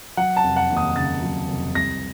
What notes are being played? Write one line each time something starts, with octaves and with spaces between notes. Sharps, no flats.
F#3 F#5
A5
F1
F#5
D#2
D#6
C#3 A6
F#3
F1
C2 A#6